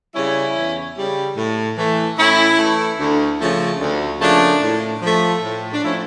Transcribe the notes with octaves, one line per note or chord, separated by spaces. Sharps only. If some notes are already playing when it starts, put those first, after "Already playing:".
C#3 G3 C#4 E4
E2
C#3 G3
A2
E3 A3
A2 C#4 E4
E3 A3
D2
C#3 F3 A3
D2
C#3 F3 A3 A#3 D4
A2
F3 A3
A2
D4
F3 A3 C#4 E4